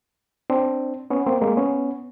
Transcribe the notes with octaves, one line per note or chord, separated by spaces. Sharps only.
C4 D4
B3 C#4
A#3 C4
G#3 A#3
B3 C#4